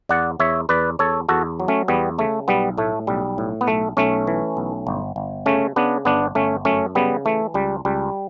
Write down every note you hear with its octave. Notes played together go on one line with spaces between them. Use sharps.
E2 D5 F#5
E2 C#5 E5
E2 B4 D5
E2 A4 C#5
E2 F#4 A4
F#3
A3 C#4
E2 G3 B3
C#3 A3
B1 G3 B3
A2 A3
B1 G3
A2
B3
B1 A3
B1 A3 C#4
E3
B1
G1
G1
C#3 A3 C#4
C#3 B3 D4
G1 B3 D4
G1 A3 C#4
F#2 A3 C#4
C#3 G3 B3
E3 A3
C#2 G3
C#2 G3